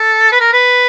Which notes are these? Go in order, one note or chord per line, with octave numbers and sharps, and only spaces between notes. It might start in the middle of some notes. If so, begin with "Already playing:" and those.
Already playing: A4
B4
A#4
B4